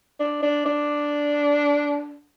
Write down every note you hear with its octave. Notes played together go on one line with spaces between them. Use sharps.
D4
D4
D4